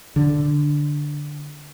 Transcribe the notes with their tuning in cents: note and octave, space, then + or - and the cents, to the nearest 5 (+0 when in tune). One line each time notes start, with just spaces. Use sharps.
D3 +0